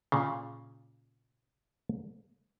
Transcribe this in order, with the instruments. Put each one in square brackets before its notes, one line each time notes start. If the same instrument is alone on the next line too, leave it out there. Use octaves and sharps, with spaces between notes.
[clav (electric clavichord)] A#2 C#3